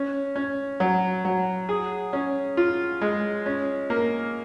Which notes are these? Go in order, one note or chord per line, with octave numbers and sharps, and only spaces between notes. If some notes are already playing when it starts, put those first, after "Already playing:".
Already playing: C#4
C#4
F#3
F#3
G#4
C#4
F4
G#3
C#4
A#3